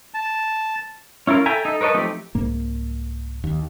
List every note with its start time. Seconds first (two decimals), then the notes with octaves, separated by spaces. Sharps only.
0.14 A5
1.27 C#4 E4 F4 A#4
1.46 A4 E5 G5 G#5 A#5
1.65 D#4 A4
1.81 A#4 B4 C#5 D#5 A5
1.94 F3 A3 C4 D#4 G4
2.35 C2 G#2 A#3
3.44 D#2